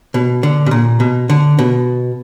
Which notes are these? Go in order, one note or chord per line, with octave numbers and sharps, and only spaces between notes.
B2
D3
B2
A#2
B2
D3
B2